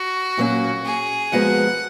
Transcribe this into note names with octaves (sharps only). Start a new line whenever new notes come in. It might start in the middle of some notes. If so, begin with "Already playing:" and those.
Already playing: F#4
A#2 F#3 A#3 C#4
G#4
F3 G#3 B3 F#4 A#4 F#5